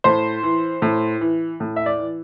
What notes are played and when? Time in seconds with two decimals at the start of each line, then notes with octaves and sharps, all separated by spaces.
0.04 A2 C5
0.43 E3
0.82 A2
1.21 E3
1.60 A2
1.76 E5
1.86 D5
1.99 E3